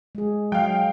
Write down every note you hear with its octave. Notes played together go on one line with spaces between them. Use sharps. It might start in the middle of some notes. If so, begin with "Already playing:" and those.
G#3 G#4
F#3 F5 G5